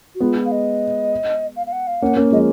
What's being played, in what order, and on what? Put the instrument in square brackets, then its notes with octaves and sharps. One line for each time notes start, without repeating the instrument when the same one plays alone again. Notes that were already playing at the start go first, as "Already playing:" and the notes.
[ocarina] F#4
[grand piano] G#3 B3 [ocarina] F4
[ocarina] F5
D#5
F5
F5
F#5
F5
[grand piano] A#3 C#4 [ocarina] F#5
[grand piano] A#3 C#4
[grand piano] F3 G#3 [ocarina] D#5